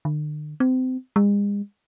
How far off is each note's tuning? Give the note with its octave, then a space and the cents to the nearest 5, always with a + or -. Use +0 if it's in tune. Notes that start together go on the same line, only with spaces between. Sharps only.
D3 +45
C4 -30
G#3 -40